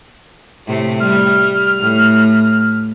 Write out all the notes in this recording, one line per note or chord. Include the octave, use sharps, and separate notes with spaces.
A2 C3 A3
G3 F6
A2